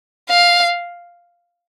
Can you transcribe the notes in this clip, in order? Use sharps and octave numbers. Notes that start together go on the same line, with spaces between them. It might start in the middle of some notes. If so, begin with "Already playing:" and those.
F5